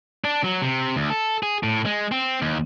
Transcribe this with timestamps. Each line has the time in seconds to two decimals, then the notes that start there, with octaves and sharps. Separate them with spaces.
0.24 D4
0.44 F#3
0.62 C3
0.96 D2
1.10 A4
1.43 G#4
1.63 A2
1.86 G#3
2.12 C4
2.42 D#2